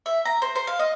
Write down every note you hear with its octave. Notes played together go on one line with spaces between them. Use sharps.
E5
A#5
C5
C5
F5
D#5